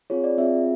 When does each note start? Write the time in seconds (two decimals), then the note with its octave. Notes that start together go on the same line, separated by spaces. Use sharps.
0.10 C4 F4 G#4 C#5
0.24 D5
0.38 C4 F4 G#4 E5